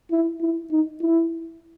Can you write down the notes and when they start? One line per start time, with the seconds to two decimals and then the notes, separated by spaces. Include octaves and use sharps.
0.11 E4
0.41 E4
0.71 D#4
1.01 E4